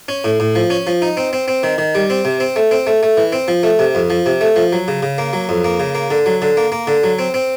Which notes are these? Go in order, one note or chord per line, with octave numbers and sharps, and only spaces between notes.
C#4
A2
A2
F3
C#4
F3
D#4
C4
C4
C4
D#3
D#3
G3
C4
C3
C4
A3
C4
A3
A3
E3
C4
F3
A3
C3
F2
F3
C3
A3
F3
F#3
C#3
C#3
A#3
F#3
F2
A#3
C#3
A#3
D3
F#3
D3
A#3
A#3
D3
F#3
C4
C4